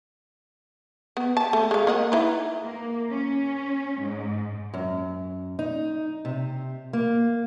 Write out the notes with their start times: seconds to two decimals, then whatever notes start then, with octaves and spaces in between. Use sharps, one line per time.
1.17 B3
1.37 A5
1.53 A3
1.71 G#3 F5
1.87 A#3 D#5 F#5
2.12 D#4 E4 B4
2.65 A#3
3.11 C#4
4.01 G#2
4.74 F#2
5.59 D#4
6.25 C3
6.93 A#3